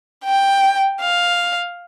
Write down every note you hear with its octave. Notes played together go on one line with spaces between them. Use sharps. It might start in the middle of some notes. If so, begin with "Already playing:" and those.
G5
F5